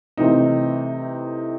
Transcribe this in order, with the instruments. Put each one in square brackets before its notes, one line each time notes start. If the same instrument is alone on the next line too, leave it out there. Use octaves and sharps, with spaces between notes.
[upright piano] C3 E3 A3 C4 D#4